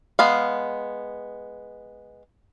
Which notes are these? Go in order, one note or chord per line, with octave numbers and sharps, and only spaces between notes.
G#3 B3 F5